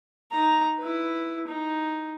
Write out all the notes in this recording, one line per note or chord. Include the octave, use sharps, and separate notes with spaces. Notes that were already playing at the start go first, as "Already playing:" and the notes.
D#4 A#5
E4 B4
D#4